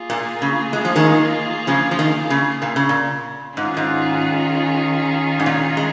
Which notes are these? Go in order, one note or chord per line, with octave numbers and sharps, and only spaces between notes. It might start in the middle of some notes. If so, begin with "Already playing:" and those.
Already playing: A#3 F4 G#4
A#2
C#3
G#3
F3
D#3 G#3
C#3 F3
F3
D#3
C#3
A#2
C#3
A#2
G#2 D#3 C#4 F4 G#4
G#2
G#2
A#2
G#3